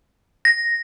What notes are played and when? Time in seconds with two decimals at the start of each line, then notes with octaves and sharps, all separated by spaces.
0.45 A#6